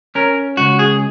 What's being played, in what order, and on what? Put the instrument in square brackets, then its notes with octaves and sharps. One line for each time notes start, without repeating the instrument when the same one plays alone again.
[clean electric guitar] C#4 A#4
C#2 F#4
G#4